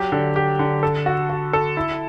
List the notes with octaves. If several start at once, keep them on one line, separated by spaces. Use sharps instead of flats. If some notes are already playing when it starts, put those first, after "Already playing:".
Already playing: F#3 G4
D3
G4
D3
A4
F#4
F#4
A4
E4